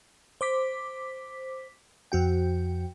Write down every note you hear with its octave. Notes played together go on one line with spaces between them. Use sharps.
C5 D6 B6
F2 F#4 G5